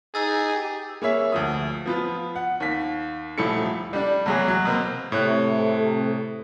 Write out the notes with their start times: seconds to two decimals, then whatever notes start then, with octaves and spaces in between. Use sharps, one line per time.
0.15 D#4 G#4 E6 A6
0.55 G4
1.02 A#3 G#4 C#5 E5
1.32 D2 F3 D#6
1.86 F3 B3 F4
2.36 F#5
2.60 D#2 B6
3.38 D#1 F3 A3 E4 A4 C#7
3.93 G3 D4
4.26 E2 F#3 G#4
4.48 F#3
4.65 B2 A#3 C4
5.12 A2 C3 A3 A4 C#5 F#6